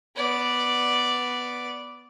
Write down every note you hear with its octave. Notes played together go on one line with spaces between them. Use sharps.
B3 D5